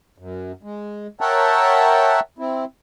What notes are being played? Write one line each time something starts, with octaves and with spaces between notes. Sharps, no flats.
F#2
G#3
A#4 C#5 E5 F#5 G5 A5
C4 E4